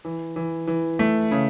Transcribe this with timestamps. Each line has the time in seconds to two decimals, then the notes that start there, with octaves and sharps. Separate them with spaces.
0.05 E3
0.36 E3
0.67 E3
0.99 A3
1.31 C#3